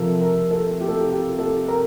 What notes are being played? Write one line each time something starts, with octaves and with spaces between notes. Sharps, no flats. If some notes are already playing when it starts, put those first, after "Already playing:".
Already playing: C3 F3 A4 A#4
A#4
A4
G4
A4
G4
G4
A4
A#4